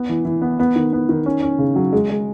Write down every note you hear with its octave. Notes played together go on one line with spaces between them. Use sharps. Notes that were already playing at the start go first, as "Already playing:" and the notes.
Already playing: B3
E3
E3
B3
B3
D#3
B3
D#3
C#4
C#4
C#3
F#3
G#3
G#3